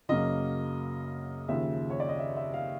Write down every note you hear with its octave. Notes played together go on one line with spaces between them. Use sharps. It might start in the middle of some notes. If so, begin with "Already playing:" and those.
F#2 C#3 F#3 A#3 D#5
D#2 C#3 F3 E5
C#5
D5
D#5
E5
E5
F5